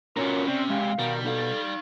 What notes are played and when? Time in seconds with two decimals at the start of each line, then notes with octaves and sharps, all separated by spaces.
0.17 A#2 B3 C#4 F4 F#4 A#4 C#5
0.48 C3 C4 D5
0.70 G#3 G4 F5
0.99 B2 D#3 G3 A#4
1.25 D#4 A4 F5